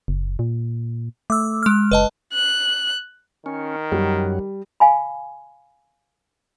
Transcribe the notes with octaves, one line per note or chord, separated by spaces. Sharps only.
F#1
A#2
A3 D6 E6
G#3 F6
F#1 B4 D#5 A5
F#6
D#3 C#4
F#2 F#3 G3
F5 G#5 B5